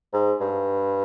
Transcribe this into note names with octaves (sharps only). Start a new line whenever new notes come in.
G#2
G2